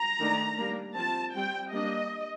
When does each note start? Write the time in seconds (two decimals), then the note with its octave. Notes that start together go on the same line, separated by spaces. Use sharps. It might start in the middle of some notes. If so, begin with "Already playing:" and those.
Already playing: A#5
0.20 D#3 A3 D4
0.58 G3 A#3 D4
0.96 F3 C4 A5
1.34 G3 C4 G5
1.72 G3 A#3 D4 D#5